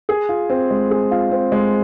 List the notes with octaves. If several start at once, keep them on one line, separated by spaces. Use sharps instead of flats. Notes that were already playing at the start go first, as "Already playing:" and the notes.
G#4
F4
C4
G#3
G#4
F4
C4
G#3